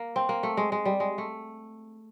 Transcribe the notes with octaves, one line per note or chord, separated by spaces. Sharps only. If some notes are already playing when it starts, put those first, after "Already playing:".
Already playing: A#3
C4
A#3
A3
G#3
G#3
G3
G#3
A3